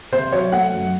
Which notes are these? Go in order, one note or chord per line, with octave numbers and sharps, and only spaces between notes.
C3 C5
F#3 C#5
A3 F#5
F#2